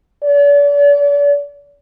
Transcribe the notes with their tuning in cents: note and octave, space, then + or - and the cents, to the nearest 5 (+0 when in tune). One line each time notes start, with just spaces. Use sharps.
D5 -40